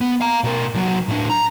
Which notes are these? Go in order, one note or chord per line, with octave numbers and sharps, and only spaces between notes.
B3
F5 A#5
B2 A#4
C2 F#3
A2 D4
A#5